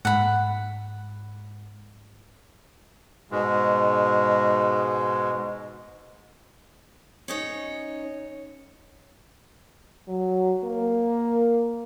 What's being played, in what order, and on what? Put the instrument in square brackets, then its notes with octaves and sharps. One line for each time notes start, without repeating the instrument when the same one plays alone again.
[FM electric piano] G#2 [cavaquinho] F#5 B5
[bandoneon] G#2 B2 G#3
[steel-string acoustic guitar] C#4 D#4 C#5
[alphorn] F#3
A#3